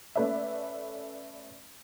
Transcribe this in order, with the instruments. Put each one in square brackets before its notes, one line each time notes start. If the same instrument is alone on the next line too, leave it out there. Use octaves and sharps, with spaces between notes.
[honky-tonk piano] A3 C#4 B4 D5 E5